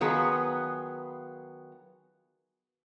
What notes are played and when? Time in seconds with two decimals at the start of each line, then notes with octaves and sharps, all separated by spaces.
0.01 D#3 F#3 B3 F4 G#4 B4